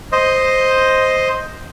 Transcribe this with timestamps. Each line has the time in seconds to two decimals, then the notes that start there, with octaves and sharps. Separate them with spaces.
0.12 C5 D#5